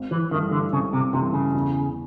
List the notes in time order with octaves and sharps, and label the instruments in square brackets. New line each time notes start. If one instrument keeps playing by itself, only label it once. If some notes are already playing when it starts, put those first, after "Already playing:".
Already playing: [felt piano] G#1
[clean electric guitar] E3
[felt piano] G2 E3 A3 D4 [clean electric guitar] D#3
[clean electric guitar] D3
[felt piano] G#1 [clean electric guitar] C#3
[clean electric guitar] C3
[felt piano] G2 E3 A3 D4 [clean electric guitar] C3
[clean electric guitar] C#3
[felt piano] E2